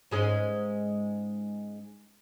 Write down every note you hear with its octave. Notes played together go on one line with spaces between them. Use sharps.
G#2 G#3 C#4